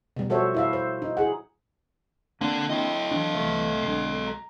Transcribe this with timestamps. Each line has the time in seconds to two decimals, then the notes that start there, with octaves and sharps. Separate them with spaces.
0.17 B2 G3
0.30 F3 F#4 A4 C5 C#5 E5
0.54 E4 E5 F5
0.73 C5
1.02 D#4
1.17 E4 G#4 F#5
2.41 D3 A#3 C4 D4
2.69 E4 A4 D#5 G5 C6
3.11 E3 F#3 D4
3.34 C2 E3 A3
3.83 B1 D3 G#3 C7
4.27 A#5